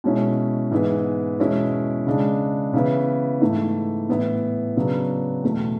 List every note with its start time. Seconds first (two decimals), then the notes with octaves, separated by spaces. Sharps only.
0.04 B2 G#3 C#4 E4
0.71 G#2 E3 G#3 B3 E4
1.38 E2 B2 G#3 C#4 E4
2.07 C#3 G#3 D4
2.73 C#3 E3 B3 E4
3.41 G#2 E3 A3 E4
4.09 A2 E3 B3 E4
4.77 C#3 F#3 B3 D4
5.44 E2 B2 A3